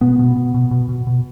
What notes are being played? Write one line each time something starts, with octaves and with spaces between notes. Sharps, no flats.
B2 B3
B2
B2
B2
B2
B2
B2